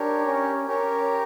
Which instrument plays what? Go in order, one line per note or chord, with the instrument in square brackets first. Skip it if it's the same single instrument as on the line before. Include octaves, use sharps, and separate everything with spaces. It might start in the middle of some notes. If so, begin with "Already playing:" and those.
Already playing: [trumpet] D4 [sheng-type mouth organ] G4 A#4 C#5
[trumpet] C#4
[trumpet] C#4 [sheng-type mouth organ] G4 A#4 C#5